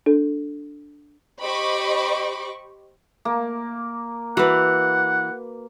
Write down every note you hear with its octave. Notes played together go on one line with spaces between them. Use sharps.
D4 A4
G4 C5 D#5 B5 C#6 D6
A#3
E3 F#4 B4 F#5